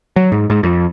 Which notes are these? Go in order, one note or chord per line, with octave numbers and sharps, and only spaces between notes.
F#3
G#2
G#2
F2